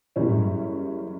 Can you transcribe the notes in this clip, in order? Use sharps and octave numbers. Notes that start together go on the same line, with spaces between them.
F#1 F#2 B2 E3 G3 C#4
A2
G2